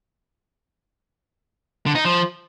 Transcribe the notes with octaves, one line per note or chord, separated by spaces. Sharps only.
D3
D#4
F3